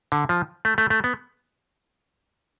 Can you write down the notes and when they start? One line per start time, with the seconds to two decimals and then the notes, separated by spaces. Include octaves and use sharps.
0.12 D3
0.29 F3
0.65 A3
0.78 A3
0.90 A3
1.04 B3